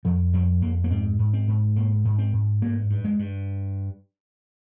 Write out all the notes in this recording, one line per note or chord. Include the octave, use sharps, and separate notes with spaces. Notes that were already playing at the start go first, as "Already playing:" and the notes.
F2 F3
F2 G3
F2 A#3
A#3
G#2 C4
G#2
C4
G#2
G#2 A#3
G#2
C4
G#2
G2 A#3
G2
G#3
G2